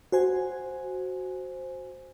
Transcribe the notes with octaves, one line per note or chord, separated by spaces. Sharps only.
F#4 C5 G#5